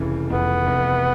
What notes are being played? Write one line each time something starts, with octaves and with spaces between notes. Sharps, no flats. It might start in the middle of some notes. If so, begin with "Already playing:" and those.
Already playing: F1 F2 C#3 E3
F2 B3
F1